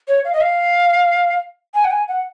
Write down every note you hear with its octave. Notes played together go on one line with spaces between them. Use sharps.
C#5
F5
D#5
F5
G#5
F#5
G#5
F#5